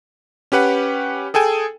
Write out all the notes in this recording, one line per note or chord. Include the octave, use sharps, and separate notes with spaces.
C#4 G4 B4 F#5
G#4 A4 G5 G#5